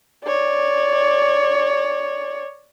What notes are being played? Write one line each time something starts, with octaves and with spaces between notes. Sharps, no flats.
C#5 D5